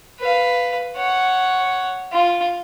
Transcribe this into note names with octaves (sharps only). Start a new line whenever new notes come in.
B4 F5
C#5 F#5
F4